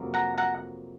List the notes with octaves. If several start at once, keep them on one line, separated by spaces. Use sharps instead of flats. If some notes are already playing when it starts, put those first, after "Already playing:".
Already playing: F2 C3 F#3 A#3
F#5 A#5
F#5 A#5